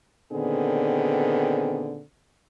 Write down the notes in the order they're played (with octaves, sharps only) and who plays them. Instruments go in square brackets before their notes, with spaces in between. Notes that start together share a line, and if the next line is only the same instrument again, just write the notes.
[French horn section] A#2 D3 D#3 B3 C4 G#4